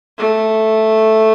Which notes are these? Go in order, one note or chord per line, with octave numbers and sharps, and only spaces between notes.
A3